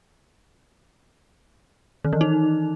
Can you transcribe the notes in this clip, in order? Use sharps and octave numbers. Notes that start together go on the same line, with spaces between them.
D#3
E3
D#4